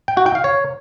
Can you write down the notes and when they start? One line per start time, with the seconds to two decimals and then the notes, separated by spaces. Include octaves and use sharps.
0.08 G5
0.17 F#4
0.26 G5
0.35 F5
0.44 C#5